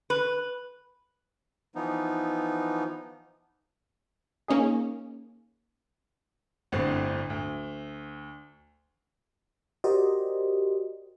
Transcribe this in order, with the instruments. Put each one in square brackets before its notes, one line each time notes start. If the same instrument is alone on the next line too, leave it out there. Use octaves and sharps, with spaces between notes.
[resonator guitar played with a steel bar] B4
[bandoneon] E3 F3 B3 D#4
[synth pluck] A#3 C#4 D#4 G#4
[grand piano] G1 A2 D3 C4
D2
[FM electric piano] F#4 G4 A#4 C5 D5 D#5